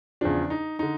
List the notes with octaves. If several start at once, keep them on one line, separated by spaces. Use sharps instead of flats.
E2 C#3 F3 D4
D#4
D3 D#4